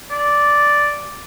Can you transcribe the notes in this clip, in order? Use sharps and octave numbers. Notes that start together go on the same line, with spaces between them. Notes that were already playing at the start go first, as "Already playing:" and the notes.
D5